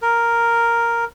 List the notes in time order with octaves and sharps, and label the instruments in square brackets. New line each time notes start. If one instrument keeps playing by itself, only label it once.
[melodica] A#4